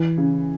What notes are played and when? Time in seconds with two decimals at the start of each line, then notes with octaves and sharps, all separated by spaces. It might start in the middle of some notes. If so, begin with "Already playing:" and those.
Already playing: E3
0.18 C#3